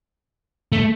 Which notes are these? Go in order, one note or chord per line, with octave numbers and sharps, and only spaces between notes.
A3